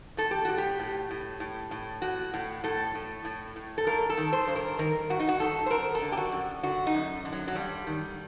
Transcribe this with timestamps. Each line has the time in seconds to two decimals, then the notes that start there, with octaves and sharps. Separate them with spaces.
0.17 A2 A4
0.31 G4
0.45 A2 F#4
0.58 G4
0.80 A2
1.11 A2
1.40 A2
1.71 A2
2.02 A2 F#4
2.34 A2
2.64 A2 A4
2.95 A2
3.25 A2
3.56 A2
3.78 A4
3.87 G2 A#4
4.10 A4
4.17 D#3
4.33 C5
4.48 G2
4.56 A#4
4.79 D#3 A#4
5.10 G2 F#4
5.20 D#4
5.29 F#4
5.40 D#3 A4
5.66 C5
5.71 F#2 A#4
5.95 A4
6.02 D3
6.12 G4
6.17 F#4
6.32 F#2
6.63 D3 F#4
6.87 D#4
6.94 F#2
7.25 D3
7.33 F#3
7.47 F#3
7.55 G2 G3
7.87 D#3